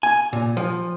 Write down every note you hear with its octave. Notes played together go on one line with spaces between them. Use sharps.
G#5
A#2
F3